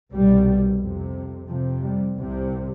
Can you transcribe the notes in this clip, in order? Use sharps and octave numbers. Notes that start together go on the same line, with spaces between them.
C2 B2 G3
F2 C3
F2 C3 F3
G3
C2 C3